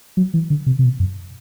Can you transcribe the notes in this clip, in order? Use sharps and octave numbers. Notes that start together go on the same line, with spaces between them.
F#3
E3
D3
C3
C3
B2
F#2